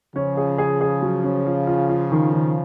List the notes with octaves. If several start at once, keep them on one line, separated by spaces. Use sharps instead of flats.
C#3 F3 C#4
G#4
G#4
G#4
F#3
C#4
F4
F4
F4
D#3
D#3